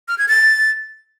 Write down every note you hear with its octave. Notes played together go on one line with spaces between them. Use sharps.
F6
G#6
A6